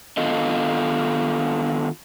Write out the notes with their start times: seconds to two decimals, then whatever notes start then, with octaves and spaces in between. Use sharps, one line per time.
0.17 D#3 B3 D4 F4 A4 D#5